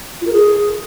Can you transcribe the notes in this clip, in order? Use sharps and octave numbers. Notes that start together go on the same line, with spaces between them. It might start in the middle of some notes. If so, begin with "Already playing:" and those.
F4
A#4
G#4